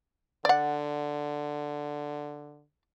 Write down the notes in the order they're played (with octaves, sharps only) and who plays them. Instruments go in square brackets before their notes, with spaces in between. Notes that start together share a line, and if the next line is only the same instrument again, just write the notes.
[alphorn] D3 [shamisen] D5 F#5